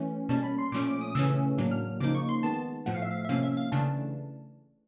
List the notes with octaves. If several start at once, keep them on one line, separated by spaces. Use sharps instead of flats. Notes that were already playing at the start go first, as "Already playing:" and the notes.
Already playing: E3 A3 C#4
B2 G3 A#3 C#4 A5
B5
C6
A#2 F3 A3 C#4 D6
D6
D#6
C#3 E3 A3 C#4 E6
A2 F#3 A#3 D4
F6
C#3 F3 A#3 D#4 D6
C#6
C6
D#3 G#3 B3 A5
A2 F3 A3 F#5
F5
E5
F5
E5
C3 F3 A#3 C#4 F5
E5
F5
C#3 E3 A3 D4 A5